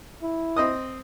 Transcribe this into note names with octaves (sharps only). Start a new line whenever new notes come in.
E4
C4 D#5 D#6